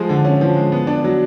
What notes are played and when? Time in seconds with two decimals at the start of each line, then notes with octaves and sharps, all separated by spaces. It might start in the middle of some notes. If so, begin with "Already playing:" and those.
Already playing: F3 G#3
0.09 D3
0.25 C#4
0.41 F3
0.56 G#3
0.72 B3
0.87 D4
1.04 F#3